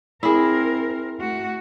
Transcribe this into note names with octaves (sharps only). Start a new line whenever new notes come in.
C4 E4 G#4 A#4
A3 F#4